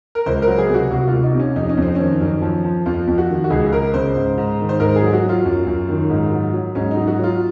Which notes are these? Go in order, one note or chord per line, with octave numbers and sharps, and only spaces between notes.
A#4
C#2 C5
A#4
F#3
G#4
C3
F#4
C2 F#4
F4
C2
D#4
C3
C#4
F2 D#4
C#4
F2
C4
D#3 C#4
F#2
F3
F3
F2 F4
F2
F#4
D#3
F#4
C#2 G#4
C#2 A#4
C#3 C5
G#2
G#2
D#3
C5
G#2 A#4
G#4
F#3
F#4
F#3
F4
F#2
F#2
D#3
G#2
F#3
F#3
G#2 C#4
D#4
F#3
F#4
F#3
F4